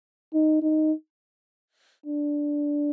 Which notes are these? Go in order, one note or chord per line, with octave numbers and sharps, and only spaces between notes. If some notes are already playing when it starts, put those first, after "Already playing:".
D#4
D#4
D4